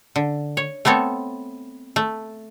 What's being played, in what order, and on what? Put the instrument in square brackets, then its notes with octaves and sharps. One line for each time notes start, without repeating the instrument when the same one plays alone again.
[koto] D3
C#5
A3 B3 C4 A4 C#5
A3